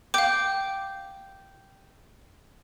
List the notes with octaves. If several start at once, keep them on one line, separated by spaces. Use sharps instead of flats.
F5 G5 D6